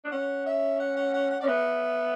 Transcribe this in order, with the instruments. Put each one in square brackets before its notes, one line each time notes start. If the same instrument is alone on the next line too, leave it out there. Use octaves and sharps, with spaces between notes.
[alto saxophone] D4
[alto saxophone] C#4 [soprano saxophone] F#5
[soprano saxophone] E5
F#5
F#5
F#5
F#5
[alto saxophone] C#4 [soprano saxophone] D5
[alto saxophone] B3 [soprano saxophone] E5